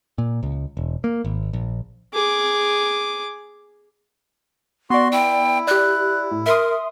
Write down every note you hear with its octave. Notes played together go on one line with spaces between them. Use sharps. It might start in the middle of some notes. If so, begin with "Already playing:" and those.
A#2
C#2
E1
A#3
G#1
A#1
G#4 D6
B3 F#4 D5 C6
E4 G5
G4 D5 F#6
A2
A#4 E5 C6 D#6